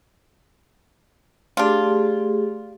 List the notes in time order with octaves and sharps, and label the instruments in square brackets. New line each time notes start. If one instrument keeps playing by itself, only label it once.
[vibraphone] A3 G4 G#4 [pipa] D4 F4